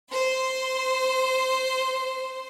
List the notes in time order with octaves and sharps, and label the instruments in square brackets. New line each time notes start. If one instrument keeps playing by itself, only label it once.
[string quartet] C5 C6